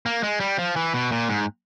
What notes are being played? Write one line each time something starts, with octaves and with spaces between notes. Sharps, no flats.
A#3
G#3
G3
F3
E3
B2
A#2
G#2